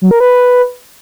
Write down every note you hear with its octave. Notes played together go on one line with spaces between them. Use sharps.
F#3
A#4
B4